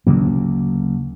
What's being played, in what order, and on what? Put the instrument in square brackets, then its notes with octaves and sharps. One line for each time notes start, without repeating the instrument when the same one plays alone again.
[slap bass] D2 C#3 F#3 A#3